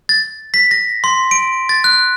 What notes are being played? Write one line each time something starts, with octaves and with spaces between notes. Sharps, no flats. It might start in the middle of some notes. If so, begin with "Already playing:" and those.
A6
B6
A#6
C6
D7
A6
F#6